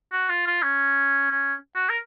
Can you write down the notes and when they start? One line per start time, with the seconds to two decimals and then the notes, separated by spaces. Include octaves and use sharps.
0.12 F#4
0.29 F4
0.47 F4
0.63 C#4
1.31 C#4
1.75 F#4
1.90 A#4